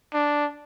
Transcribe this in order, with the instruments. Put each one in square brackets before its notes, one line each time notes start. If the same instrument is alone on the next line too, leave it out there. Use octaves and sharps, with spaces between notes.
[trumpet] D4